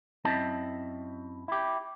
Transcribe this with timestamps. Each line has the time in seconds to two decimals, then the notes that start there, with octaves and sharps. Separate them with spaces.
0.25 F#2 C4 E4 D#5 A5
1.48 E4 G4